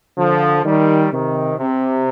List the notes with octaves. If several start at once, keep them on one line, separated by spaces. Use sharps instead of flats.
D3 F3
D#3 G3
C3 D#3
C3